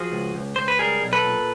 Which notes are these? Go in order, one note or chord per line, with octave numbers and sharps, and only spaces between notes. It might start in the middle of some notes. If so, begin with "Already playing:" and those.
Already playing: F3 F#4 G#4
C#2
C#2
C#2 C5
B4
G3 G#4 A#4
B1
A4 B4
A#2